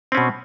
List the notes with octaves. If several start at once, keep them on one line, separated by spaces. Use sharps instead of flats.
B2 C4 C#4